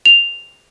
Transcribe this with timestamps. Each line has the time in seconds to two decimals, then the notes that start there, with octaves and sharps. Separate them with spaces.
0.06 F7